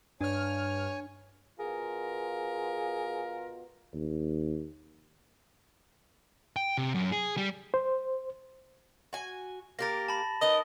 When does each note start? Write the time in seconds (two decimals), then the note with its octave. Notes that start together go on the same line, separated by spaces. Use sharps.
0.21 G2 D4 C#5 G#5 F6
1.60 B2 F4 G#4 A#4
3.94 D#2
6.56 G5
6.77 C3
6.95 F#2
7.12 G#4
7.37 G3
7.74 C5
9.13 F#4 G#5
9.79 A#3 G4 A#4 A6 A#6
10.08 A5 B5
10.41 D#4 A#4 B4 D#5 D#6